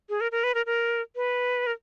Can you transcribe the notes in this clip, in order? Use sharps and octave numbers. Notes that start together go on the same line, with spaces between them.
G#4
A#4
A#4
B4
A#4
A#4
B4
A#4